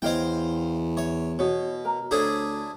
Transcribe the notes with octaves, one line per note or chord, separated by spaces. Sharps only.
E2 E4 C5 C#5 D#5 F5 G5
C#5 E5
B2 C#5
A#4 A#5
D2 D4 E4 G#4 A4 C5 C#5